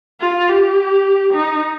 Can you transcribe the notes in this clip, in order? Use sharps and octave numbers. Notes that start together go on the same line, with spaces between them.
F4
G4
D#4